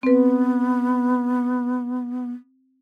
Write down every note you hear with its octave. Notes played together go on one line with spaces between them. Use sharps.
B3 C4 B4